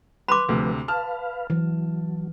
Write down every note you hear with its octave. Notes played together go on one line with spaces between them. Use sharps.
B4 B5 C6 D6
D2 C3 F3 A3 B4
B4 F5 A5 F6
E3 F#3